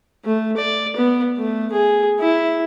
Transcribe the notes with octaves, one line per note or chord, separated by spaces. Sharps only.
A3
D5
B3
A3
G#4
E4